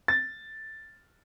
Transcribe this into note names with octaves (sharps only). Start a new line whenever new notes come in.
A6